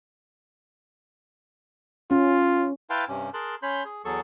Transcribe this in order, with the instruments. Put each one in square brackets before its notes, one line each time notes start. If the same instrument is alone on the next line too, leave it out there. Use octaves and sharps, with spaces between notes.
[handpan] C#4 [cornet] F4
[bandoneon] E4 B4 F5 G5 A5 C6
G2 C3 C#4
G#4 A#4 A5 C6 F#6
C#4 C#5 B5 C6 G6
G#4
E2 F#3 G#4 A4 C#6